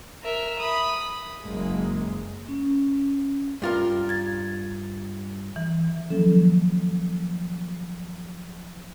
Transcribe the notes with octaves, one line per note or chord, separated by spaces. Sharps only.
A#4 E5
B5 D#6
F#1 G#3 A#3
C#4
G2 F4 A#4
G#6 A6
E3
D#3 F3 F#3 A#3 C#4 A4